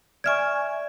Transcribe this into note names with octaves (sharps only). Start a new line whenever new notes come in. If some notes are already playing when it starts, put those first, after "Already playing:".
D5 E5 G#5 C#6 F6 G#6